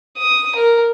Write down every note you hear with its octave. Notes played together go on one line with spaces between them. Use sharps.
D#6
A#4